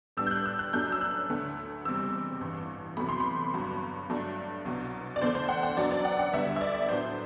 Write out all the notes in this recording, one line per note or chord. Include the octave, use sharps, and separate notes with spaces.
A2 G3 B3 D4 E6
G6
F#6
E6
F#6
F#2 F#3 A3 D4 G6
E6
F#6
D2 D3 A3
F#1 E2 C3 G3 C4 E6
A1 G2 E3
E2 C3 F#3 A3 B5
C6
B5
G1 G2 F#3
G2 F#3 A3 D4
C2 B2 F#3
D5
E2 D3 A3 D4 C5
C5
F#5
F#5
F#2 F#3 B3 D4 D5
D5
F#5
F#5
D2 D3 G3 B3 E5
E5
D5
A2 F#3 B3 D4 C5